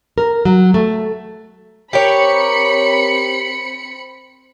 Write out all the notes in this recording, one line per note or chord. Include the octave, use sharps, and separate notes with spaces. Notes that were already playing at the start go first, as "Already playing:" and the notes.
A#4
F#3
A3
C4 G4 A#4 C#5 B5 C#7